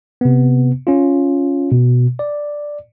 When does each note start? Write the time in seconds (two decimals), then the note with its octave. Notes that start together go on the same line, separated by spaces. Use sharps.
0.21 C3 B3
0.87 C#4 F4
1.72 B2
2.19 D5